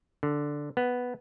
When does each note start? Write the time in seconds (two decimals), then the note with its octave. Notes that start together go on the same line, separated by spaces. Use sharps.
0.23 D3
0.77 B3